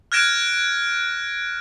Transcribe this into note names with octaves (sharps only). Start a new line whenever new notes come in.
F6 F#6 G#6 A#6 D7 E7